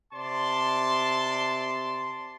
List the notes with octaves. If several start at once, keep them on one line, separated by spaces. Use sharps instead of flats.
C3 D5 A5 C6